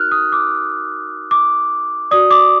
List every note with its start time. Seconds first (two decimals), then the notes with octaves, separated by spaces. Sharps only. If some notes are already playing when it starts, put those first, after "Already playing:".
Already playing: D#4 F#4 A#4 F6 F#6
0.12 D#6
0.32 D6
1.31 D6
2.11 F#4 D5 D#6
2.31 D6